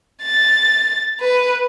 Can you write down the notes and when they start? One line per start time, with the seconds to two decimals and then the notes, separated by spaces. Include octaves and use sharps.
0.23 A6
1.20 B4